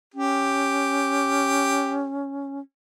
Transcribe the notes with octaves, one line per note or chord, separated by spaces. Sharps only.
C#4 G4